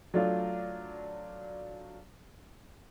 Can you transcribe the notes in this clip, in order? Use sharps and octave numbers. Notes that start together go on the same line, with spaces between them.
F#3 A3 D4 F4